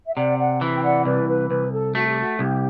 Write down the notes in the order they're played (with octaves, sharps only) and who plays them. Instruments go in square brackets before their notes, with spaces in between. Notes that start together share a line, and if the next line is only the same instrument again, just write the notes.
[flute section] E5
[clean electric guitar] C3 [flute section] D5 F#5
[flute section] D5 F#5
[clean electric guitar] E3
[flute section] G5
D5 F#5
[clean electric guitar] C2 [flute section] B4 D5
[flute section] B4
[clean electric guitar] C2 [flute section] B4
[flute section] A4
[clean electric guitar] A3 [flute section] F#4
[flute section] G4
F#4
[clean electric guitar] C2 [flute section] G4